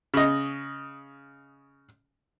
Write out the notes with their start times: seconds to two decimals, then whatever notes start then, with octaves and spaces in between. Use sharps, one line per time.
0.14 C#3 D#5